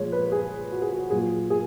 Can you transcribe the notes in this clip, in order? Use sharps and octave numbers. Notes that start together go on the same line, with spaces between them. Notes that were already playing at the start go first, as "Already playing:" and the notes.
Already playing: A#2 F3 G#3 C#5
B4
G#4
F#4
G#4
F#4
A#2 F#3 G#4
G#4